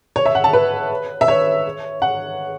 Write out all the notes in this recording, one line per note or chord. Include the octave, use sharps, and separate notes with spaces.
C#5
E5
F#5
A5
B4
E5
C#5
F#5